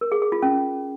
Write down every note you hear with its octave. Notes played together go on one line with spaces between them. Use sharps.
A#4
G#4
G#4
F4
C#4